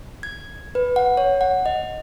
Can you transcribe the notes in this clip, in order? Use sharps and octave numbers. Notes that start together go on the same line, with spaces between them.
G#6
B4
F#5
C#5
F#5
D#5